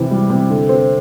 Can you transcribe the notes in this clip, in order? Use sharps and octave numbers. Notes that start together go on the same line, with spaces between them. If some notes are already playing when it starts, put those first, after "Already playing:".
Already playing: C3 E3
G3
C3
D3
C4